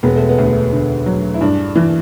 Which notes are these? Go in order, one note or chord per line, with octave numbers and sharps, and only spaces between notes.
E1 B3
A3
B3
D2
D3
F#3
E4
G2 D4
E3